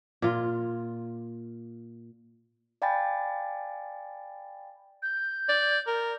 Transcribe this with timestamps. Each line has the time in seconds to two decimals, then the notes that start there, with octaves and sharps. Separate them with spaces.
0.22 A#2 F4
2.82 D5 F5 G5 G#5 B5 A6
5.02 G6
5.49 D5
5.87 A#4